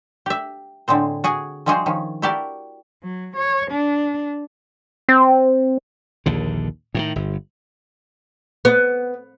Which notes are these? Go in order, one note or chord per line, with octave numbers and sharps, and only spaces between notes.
G4 E5
A2 D3 G#3 C4 C5
F#4 G#4 F#5 G#5
F3 G3 G#3 F#4 G#4 C5
D#3 F3 C#4
E4 F#4 G4 A#4 D5 A5
F#3
C#5
D4
C4
A#1 D#2 D3
A2 D3 D#3
G1
B3